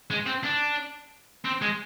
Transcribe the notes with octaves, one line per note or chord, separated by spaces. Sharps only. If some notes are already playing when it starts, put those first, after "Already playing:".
G#3
C4
D4
C4
G#3